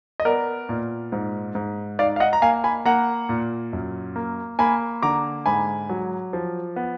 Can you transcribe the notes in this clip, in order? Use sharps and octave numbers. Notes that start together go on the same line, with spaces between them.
D#5
B3 A#4 D5
A#2
G#2
G#2
D#4 D5 F5
F5
D#5 F#5
A#5
A#3 F5 G#5
G#5 B5
A#3 F#5 A#5
A#2
F#2
A#3
A#3 G#5 B5
D3 A#5 D6
G#2 G#5 B5
F#3
F3
B3